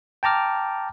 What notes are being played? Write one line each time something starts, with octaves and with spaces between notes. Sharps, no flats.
G5 A5 A#5 D6 F6